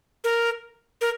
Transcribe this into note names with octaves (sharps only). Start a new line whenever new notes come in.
A#4
A#4